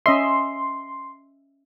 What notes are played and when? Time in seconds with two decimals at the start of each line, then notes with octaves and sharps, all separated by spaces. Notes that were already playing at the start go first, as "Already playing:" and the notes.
0.06 C#4 D#5 E5 C6